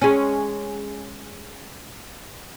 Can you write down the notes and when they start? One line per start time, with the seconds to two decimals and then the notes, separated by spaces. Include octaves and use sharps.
0.02 G#3 C#4